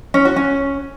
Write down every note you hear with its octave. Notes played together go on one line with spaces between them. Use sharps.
C#4
F#4
C#4